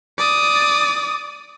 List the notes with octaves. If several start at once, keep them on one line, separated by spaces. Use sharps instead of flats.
D5 D#6